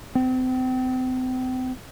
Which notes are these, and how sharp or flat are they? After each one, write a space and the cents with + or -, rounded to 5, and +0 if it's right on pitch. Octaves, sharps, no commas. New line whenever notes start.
C4 -35